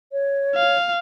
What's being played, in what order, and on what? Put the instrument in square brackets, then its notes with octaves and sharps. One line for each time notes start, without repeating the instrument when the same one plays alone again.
[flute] C#5
[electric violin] F5